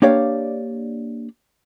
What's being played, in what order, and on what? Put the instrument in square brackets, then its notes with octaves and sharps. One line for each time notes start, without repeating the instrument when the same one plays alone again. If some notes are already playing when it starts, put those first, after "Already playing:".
[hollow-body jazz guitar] A#3 D4 G4 C#5 D5 F5